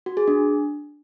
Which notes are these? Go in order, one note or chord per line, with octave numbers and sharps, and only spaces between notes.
F#4
G#4
D4